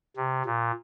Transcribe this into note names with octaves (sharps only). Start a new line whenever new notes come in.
C3
A#2